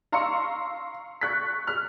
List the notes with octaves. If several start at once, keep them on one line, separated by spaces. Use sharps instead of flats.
F5 A#5 C6 C#6 E6 C#7
C#6 F#6 B6
F6